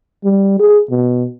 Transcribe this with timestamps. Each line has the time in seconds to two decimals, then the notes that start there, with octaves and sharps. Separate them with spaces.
0.24 G3
0.60 G#4
0.90 B2